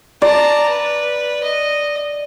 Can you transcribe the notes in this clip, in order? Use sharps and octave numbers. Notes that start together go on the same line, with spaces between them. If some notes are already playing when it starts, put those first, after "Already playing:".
D5 A5 A#5
B4
D#5